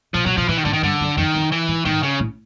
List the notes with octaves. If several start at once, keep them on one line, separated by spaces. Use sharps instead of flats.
A#2 F3
A#2 F#3
B2 F3
A2 E3
D#3
G#2 D3
D#3
G2 D3
F#2
F2 D#3
F2
E3
G#2
G#2 D#3
C#3
A2